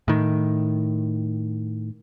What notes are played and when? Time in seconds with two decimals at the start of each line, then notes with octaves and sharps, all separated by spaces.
0.08 A2 D#3